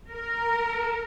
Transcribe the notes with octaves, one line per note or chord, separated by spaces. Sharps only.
A#4